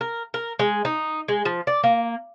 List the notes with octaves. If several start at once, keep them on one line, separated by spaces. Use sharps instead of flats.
A#4
A#4
G#3
D#4
G#3
F3
D5
A#3